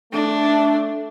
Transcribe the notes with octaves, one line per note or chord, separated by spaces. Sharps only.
A3 D4